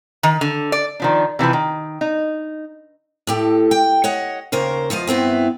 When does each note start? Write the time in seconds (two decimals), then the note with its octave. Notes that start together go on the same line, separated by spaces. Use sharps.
0.23 D#3
0.41 D3
0.72 D5
1.00 D#3 F3 D4
1.39 C3 E3 F3 B4
1.53 D#3
2.01 D#4
3.27 A2 G4 A4
3.71 G5
4.04 C#5 D#5 F#5
4.52 D#2 C#3 A#4 C5
4.90 E2 F3 F4 D#5
5.07 G2 B3 C4 E4